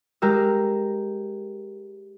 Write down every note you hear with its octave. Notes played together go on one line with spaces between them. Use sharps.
G#3 G4 A#4 E6